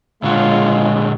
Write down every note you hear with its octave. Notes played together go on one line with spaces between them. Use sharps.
A#2 D3 G#3 F4 F#4 C#5